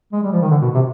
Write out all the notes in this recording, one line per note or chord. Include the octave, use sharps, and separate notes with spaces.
G#3
G3
F3
D#3
D3
B2
C3